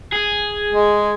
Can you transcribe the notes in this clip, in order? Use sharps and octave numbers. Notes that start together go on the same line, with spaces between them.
G#4
G#3